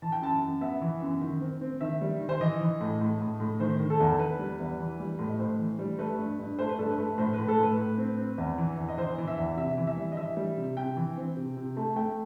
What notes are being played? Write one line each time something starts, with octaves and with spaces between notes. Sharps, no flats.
E3 A5
G5
F#2 A5
F#2
B3 E5
E3
F#2
D#3
C4
C4
D#3 E5
G3
D#3
C5
E3 D#5
E3
A2
A2
A2
A2
D#3 C5
D#3
A4
E2
E2 B4
G3
E2
E3
G3
A2
D#5
A2 C5
E3
G3
A3 B4
G2
G2
A3 C5
B4
G2 A4
B4
A3
A2 C5
B4
A2
A4
A2
B4
A2
C4
C4
E2
E3
E2
D#5
E3 C5
E3
E5
E2
C3 E5
E3
E5
G3
D#5
E3 E5
G3
C3
C3 G5
E3
C4
C3
C3
A3
A3 G5